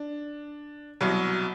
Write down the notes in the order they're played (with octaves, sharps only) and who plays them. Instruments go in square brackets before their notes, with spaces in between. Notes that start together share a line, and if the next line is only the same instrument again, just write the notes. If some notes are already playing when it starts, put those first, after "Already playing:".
Already playing: [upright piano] D4
C2 B2 F#3